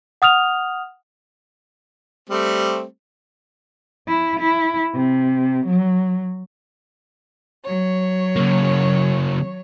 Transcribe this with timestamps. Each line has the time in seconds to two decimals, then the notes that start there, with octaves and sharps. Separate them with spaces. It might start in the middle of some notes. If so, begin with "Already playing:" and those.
0.22 F#5 D#6 F6 F7
2.30 G3 A3 C4
4.08 E4
4.40 E4
4.94 C3
5.66 F#3
7.64 F#3 C#5
8.36 C#3 A#3